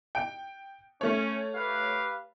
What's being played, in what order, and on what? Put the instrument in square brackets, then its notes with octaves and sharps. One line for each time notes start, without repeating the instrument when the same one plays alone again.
[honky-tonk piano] G5 D7
[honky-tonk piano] A3 C#5 [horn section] C#4
[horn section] G4 B4 F5